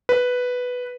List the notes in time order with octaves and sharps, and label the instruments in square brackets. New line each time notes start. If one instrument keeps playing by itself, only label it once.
[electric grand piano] B4